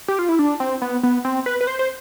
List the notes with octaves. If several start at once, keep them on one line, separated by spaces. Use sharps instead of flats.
G4
F4
E4
D4
C4
B3
B3
C4
B4
B4
C5
C5